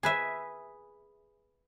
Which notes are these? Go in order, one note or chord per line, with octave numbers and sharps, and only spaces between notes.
G#4 B4 E5